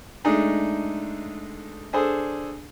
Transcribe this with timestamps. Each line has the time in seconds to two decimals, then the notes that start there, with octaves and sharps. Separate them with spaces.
0.24 G#3 A3 D4 D#4 G#4
1.93 D4 G#4 A4 C5